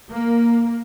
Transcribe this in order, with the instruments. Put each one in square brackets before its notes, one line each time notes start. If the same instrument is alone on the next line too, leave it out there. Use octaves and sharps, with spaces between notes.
[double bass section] A#3